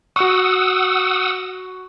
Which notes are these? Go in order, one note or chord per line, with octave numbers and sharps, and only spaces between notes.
F#4 F#5 C#6 D#6 E6